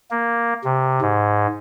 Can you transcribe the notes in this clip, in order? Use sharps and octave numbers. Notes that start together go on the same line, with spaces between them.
A#3
C3
G#2